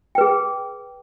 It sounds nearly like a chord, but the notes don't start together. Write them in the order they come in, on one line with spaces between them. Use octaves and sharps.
G5 B4 G#4